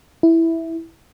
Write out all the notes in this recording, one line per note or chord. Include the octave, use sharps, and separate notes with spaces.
E4